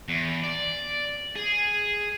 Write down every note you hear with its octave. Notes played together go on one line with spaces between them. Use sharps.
E2
D5
G#4